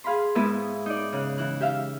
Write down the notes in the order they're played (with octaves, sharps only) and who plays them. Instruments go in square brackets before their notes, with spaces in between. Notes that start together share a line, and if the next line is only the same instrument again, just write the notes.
[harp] G#4 F5 B5 C6
G#2 B3 E4 B4 D#6
D#4 D5
C#3 F#6
E3 F#6
G4 E5 F5